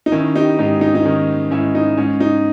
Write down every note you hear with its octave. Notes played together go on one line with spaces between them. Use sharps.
D#4
D#3 C#4 E4
D#4 G4
G#2 D#4 G4
D#4
D#4
D#3 C#4
G#2 C#4 E4
D#4
G#2 C#4
D#4